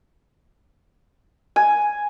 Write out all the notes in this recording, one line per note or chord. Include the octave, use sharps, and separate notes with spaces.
G#5